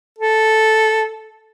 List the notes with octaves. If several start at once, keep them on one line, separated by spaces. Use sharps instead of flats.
A4